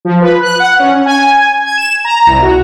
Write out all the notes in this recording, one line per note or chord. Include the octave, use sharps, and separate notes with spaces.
F3
B4
F#6
F#5
C#4
G#5
G#6
E7
A#5
C2
F#4